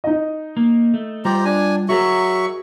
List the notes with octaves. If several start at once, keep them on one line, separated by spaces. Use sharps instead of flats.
D#4 D#5
A#3
A3
G3 F4 G4 C5 A#5
D4 G#5
F#3 F#4 G#4 A#4 E5 C#6